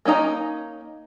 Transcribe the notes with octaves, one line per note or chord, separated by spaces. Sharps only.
A#3 C#4 D#4 A#5